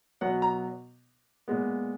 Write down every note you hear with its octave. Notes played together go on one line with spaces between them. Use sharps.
B2 F#3 B3 F#5
A#5
A#2 G#3 B3